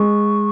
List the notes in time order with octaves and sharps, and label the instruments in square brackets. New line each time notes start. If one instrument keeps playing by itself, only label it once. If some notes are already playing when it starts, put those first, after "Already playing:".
Already playing: [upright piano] G#3 [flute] C#6